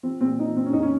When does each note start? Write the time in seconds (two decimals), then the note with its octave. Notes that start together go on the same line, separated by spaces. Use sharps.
0.03 F3 C4
0.21 A#2 C4
0.39 F3 D#4
0.56 A#2 C4
0.66 C#4
0.73 F2 D#4
0.82 C#4